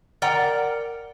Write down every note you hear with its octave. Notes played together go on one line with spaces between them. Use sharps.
A#4 D5 F#5 G5 A#5